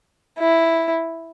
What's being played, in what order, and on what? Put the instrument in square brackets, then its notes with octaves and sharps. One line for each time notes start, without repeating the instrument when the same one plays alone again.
[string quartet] E4